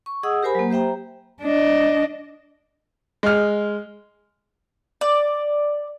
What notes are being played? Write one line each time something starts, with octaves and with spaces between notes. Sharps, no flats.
C#6
G#4 D#5 F#5 D#6 E6
G4 A#4 C5 G#5 B5
F#3 A#3
G4 C5 E5 G5 A#5
D4 D#5
G#3 F6
D5